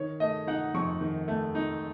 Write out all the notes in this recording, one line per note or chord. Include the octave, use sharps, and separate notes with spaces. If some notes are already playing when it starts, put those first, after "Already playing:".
Already playing: D#3 C#5
A3 D#5
D#4 F#5
F2 C#6
D#3
A3
D#4